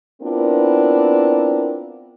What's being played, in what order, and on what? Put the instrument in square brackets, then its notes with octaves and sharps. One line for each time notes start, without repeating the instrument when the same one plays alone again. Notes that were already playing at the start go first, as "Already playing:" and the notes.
[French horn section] B3 C4 D4 E4 F4 A#4